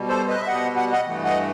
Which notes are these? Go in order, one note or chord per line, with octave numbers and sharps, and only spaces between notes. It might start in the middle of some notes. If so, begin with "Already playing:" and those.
Already playing: B2 G3
A4 C5
B4 D#5
E5
B2 G3 D#5 F#5
F#5
D#5 F#5
G2 E3 A3
D#5 F#5